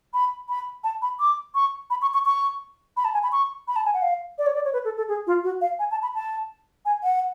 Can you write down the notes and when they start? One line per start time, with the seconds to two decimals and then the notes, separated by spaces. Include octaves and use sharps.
0.14 B5
0.49 B5
0.84 A5
1.02 B5
1.20 D6
1.55 C#6
1.90 B5
2.02 C#6
2.14 C#6
2.26 C#6
2.97 B5
3.05 A5
3.14 G#5
3.23 B5
3.32 C#6
3.68 B5
3.76 A5
3.85 G#5
3.94 F#5
4.02 F5
4.38 D5
4.46 C#5
4.55 D5
4.65 C#5
4.73 B4
4.85 A4
4.97 A4
5.08 G#4
5.27 F4
5.44 F#4
5.61 F5
5.79 G#5
5.91 A5
6.03 B5
6.15 A5
6.85 G#5
7.03 F#5